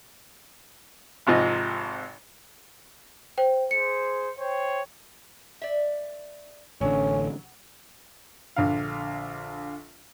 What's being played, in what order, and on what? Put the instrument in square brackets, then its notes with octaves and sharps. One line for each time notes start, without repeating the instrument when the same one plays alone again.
[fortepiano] G#1 G#2 C3 F3 D#5
[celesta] C5 G5
[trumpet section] G#4 C5 [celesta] C#7
[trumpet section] C5 C#5 G5
[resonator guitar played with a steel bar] D5 E5
[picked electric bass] A1 D3 [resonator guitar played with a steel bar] F#3 [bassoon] C#4
[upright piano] A#1 D3 F5